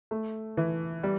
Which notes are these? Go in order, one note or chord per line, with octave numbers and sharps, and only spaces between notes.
A3
E3
G3